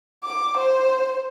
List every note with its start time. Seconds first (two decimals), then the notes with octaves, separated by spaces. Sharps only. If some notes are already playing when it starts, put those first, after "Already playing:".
0.24 D6
0.57 C5